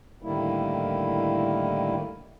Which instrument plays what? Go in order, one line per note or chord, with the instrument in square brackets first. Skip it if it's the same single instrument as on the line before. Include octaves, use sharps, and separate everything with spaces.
[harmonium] A2 D3 D#3 G3 A#3 E4